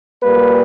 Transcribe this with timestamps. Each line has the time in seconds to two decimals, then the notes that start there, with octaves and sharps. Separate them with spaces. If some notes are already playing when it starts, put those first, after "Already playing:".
0.22 A#2 G3 A#3 B4